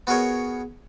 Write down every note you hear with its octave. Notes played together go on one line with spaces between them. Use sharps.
B3 F#4 G#4 A#4 C#5